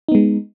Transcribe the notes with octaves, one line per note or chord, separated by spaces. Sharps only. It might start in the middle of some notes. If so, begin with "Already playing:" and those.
G#3 B3 D#4